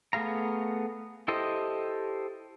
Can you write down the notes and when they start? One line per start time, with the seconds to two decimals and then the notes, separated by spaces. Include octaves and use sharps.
0.13 A3 B3 G#4 F5 A#5
1.28 E4 G4 A4 C5 D#5